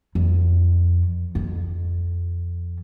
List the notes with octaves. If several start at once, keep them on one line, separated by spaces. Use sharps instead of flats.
F2
F2